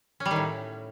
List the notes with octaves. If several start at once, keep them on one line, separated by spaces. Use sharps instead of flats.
C#4
G3
D#3
A2